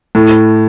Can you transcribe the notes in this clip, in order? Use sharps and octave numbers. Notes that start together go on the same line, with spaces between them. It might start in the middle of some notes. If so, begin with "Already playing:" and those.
A2